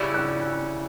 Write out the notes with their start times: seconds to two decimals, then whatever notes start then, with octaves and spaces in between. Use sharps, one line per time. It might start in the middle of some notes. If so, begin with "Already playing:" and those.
Already playing: C#3 G3 C#4 E4 E6
0.14 F#6